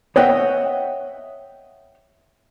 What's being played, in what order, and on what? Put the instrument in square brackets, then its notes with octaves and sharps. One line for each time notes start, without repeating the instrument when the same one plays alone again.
[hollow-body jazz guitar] C#5 D#5 E5 F#5 G5